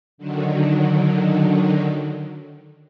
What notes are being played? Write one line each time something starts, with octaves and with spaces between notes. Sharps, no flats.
D3 D#3 F#3